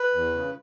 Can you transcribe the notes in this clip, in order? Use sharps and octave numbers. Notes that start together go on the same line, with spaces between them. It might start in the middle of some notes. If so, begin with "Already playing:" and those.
Already playing: B4
E2
C#3